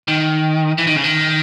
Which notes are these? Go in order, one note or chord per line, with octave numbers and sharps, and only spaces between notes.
D#3
E3
D#3
C#3
D#3